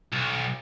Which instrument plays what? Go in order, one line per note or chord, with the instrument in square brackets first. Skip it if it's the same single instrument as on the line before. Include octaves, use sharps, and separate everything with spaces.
[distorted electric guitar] B1